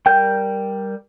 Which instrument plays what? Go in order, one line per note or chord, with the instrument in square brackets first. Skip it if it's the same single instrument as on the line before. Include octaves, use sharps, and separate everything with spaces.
[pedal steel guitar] G3 A#4 G6 [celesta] G5